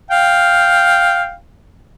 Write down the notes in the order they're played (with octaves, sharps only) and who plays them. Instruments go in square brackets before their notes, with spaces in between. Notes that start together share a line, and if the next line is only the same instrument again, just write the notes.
[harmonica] F5 G5